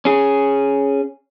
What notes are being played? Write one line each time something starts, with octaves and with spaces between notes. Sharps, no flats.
C#4 G#4